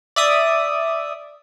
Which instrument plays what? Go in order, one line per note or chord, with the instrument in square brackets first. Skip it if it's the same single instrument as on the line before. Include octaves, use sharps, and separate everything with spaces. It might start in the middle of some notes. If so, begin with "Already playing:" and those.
[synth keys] D5 E5 D#6